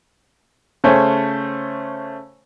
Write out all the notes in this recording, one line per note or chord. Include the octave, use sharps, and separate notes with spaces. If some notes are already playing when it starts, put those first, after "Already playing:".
C#3 A3 C5 C#5 G#5